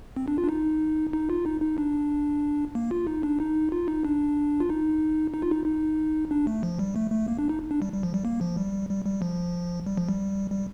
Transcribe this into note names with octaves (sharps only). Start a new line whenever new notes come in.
C4
D4
F4
D4
D#4
D#4
F4
D#4
D#4
D4
A#3
F4
D#4
D4
D#4
F4
D#4
D4
F4
D#4
D#4
F4
D#4
D#4
D4
A3
F3
G3
A3
A3
A#3
D4
D#4
D4
G3
G3
F3
G3
A#3
F3
G3
G3
G3
F3
G3
F3
G3
G3